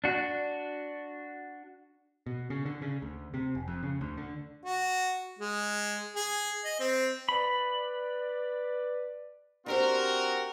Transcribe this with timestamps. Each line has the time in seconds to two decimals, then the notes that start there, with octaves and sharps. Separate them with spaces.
0.04 D4 F#4
2.27 B2
2.50 C#3
2.65 D3
2.82 C#3
3.02 D2
3.34 C3
3.55 F1
3.68 F2
3.83 C#3
4.01 D2
4.17 D3
4.65 F#4
5.39 G#3
6.16 G#4
6.64 D#5
6.79 C4
7.29 B4 D5 B5
9.66 C4 D4 F#4 G4 A#4 C5